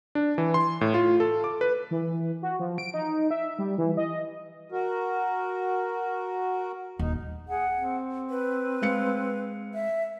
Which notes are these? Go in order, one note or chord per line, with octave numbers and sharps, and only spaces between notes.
D4
E3
C6
A2
F4
A4
D6
B4
E3
F#4
F3
D7
D#4
E5
G3
E3
D#5
F#4 A#4
D#1 D#4
G#4 F#5
C4
B4
G#3 F5 C#7
E5